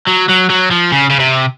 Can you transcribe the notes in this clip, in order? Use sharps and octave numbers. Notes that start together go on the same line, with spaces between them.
F#3
F#3
F#3
F3
C#3
C#3
C3